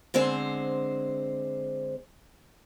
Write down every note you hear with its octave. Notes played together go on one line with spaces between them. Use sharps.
D3 G#3 C4 C5